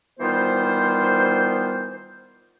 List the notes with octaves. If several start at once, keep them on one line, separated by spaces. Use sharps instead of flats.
D#3 E3 G3 B3 F4 C5